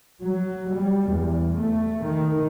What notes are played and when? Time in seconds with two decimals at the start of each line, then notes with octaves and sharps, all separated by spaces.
0.22 F#3
0.74 G3
1.10 E2
1.59 A3
2.04 D#3